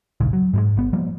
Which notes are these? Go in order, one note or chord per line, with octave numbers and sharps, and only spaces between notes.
D#1 A#1 G#2 C#3
F#3
G#2 G3 G#3
G#1 B3
F3 G3 A#3